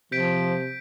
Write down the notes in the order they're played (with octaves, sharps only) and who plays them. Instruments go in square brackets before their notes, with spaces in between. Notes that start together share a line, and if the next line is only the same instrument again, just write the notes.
[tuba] C3 [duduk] F3 [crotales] G6 B6 D7